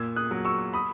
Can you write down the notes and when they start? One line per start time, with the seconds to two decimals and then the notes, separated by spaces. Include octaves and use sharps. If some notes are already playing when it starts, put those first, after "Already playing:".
Already playing: A#2 E6 G#6
0.16 D#6 F#6
0.31 F#3
0.45 C#6 E6
0.74 B5 D#6